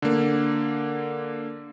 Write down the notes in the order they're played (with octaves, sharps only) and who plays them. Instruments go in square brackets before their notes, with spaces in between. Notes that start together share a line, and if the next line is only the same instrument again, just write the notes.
[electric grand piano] D3 A#3